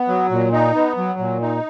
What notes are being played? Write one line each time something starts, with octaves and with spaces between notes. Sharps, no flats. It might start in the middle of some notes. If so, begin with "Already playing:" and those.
Already playing: B3
F#3
A#2
D#4
B3
F#3
A#2
D#4